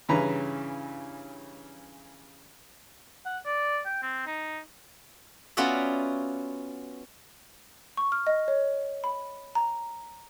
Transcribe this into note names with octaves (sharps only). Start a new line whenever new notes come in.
G2 C#3 E3 C#4 B4 A#5
F#5
D5
G5
C4
D#4
B3 C#4 F4 F#4 D5 E5
C#6
F6
D#5
C#5
B5
A#5